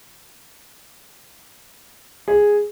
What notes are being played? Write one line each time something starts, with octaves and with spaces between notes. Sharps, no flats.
G#4